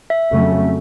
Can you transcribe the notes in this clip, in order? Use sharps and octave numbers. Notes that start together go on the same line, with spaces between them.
E5
F2 C#3 F#3 A3 C#4